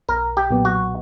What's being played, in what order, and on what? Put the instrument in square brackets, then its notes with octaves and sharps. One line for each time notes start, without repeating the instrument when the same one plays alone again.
[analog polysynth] B1 [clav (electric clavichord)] A#4
[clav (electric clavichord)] G4
[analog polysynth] A#2 F#3 B3
[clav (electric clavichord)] F#4